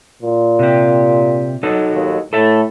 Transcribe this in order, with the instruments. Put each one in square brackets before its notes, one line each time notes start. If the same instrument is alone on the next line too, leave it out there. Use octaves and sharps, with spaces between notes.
[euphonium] A#2
[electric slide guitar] C3 G4
F#3 D#4 A4
[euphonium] D#2
[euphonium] A2 [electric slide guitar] A4 E5 A5